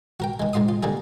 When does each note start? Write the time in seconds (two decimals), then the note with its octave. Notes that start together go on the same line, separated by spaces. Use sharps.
0.20 F#4 A#4 G5
0.40 D#3 G#3
0.53 C#2 G#2 F4 C6 D#6
0.69 F4
0.83 D3 G3 A#3 G#4